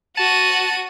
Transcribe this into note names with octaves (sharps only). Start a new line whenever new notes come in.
F#4 A5 D#7